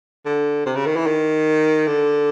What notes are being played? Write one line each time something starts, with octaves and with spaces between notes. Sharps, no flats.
D3
C3
C#3
D#3
E3
D#3
D3